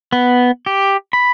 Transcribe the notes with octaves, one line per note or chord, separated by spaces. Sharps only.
B3
G4
B5